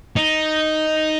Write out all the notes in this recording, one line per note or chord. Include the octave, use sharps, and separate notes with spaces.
D#4